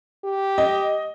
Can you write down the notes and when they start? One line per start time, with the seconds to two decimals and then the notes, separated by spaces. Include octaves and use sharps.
0.24 G4
0.58 D#5